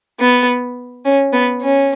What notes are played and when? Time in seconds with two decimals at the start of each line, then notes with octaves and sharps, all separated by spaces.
0.20 B3
1.05 C#4
1.33 B3
1.62 C#4